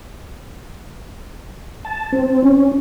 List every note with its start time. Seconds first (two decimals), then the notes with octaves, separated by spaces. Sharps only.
1.85 A5
2.12 C4
2.43 C#4